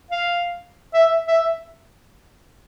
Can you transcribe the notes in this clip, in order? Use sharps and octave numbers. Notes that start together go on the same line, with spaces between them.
F5
E5
E5